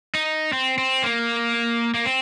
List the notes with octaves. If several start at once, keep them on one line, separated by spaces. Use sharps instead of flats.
D#4
C4
C4
A#3
A#3
C4